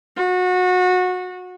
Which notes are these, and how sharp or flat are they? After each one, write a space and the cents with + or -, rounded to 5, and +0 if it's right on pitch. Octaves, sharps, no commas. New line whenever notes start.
F#4 -25